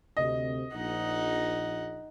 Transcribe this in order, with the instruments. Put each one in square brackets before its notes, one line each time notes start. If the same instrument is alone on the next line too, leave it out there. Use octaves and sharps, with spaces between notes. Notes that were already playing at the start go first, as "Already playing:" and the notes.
[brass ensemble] D2 C3 [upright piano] D#5
[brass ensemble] A#1 [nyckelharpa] D#4 F#5